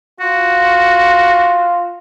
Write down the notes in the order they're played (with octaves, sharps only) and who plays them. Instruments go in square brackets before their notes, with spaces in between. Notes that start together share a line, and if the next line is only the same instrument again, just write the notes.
[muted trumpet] F4 [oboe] F#4